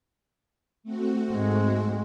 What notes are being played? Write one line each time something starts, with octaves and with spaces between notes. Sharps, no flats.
A3 C4 F#4
G#2 G#3